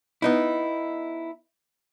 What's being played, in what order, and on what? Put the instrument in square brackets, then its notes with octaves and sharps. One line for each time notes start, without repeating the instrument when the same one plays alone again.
[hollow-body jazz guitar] B3 D#4 E4